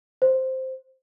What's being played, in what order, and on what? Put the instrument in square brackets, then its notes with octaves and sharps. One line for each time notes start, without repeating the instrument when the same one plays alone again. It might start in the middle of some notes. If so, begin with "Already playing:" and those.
[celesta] C5